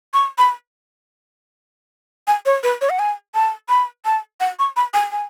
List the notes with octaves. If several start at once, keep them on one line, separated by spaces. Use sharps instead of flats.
C#6
B5
G#5
C#5
B4
C#5
F#5
G#5
A5
B5
A5
F#5
C#6
B5
G#5
G#5